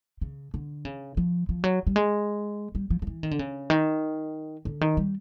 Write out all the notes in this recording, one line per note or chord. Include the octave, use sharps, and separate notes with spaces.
C#3
D3
C#3
F3
F3
F#3
G3
G#3
G3
F3
F3
E3
D#3
D3
C#3
D#3
D3
D#3
G3